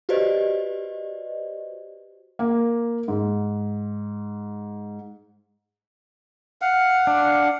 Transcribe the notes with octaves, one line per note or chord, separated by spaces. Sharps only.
F#4 G4 B4 C5 D5 D#5
A#3
G#2
F5 F#5
D4